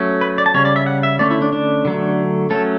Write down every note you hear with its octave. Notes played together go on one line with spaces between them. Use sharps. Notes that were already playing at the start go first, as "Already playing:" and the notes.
Already playing: F#3 A3 C#4
B4
D5
A5
C#3 G3 C#4 C#5
D5
E5
F#5
E5
D3 A3 C#4 D5
E4
D4
D4
D3 F#3 A3
F#3 A3 C#4 A4